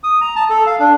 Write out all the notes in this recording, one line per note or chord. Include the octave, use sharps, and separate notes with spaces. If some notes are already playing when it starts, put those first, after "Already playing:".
D#6
A#5
A5
A4
F5
D4